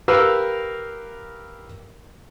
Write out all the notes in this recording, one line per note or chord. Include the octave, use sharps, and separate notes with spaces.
G4 A#4 B4 F5 E6